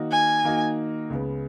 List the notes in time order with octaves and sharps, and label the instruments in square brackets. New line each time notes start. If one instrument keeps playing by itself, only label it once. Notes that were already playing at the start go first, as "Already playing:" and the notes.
Already playing: [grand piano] D#3 A#3 D#4 F#4
[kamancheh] G#5
[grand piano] D#3 A#3 D#4 F#4
C#2 C#3 G#3 B3